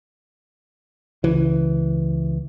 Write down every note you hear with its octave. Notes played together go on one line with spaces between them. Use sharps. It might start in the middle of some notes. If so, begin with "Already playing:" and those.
C#2 E3